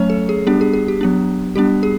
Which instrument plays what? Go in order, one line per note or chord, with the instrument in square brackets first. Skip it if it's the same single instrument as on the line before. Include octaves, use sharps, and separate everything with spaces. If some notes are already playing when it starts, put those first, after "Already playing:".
Already playing: [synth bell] F#3 A3 C#4 C#5
A4
G#4
G3 B3 D4 G4
G#4
G#4
G4
F#3 B3 D4
G3 B3 D4 G4
G#4